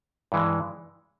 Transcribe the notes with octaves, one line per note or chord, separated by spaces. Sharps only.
G2 E3 G#3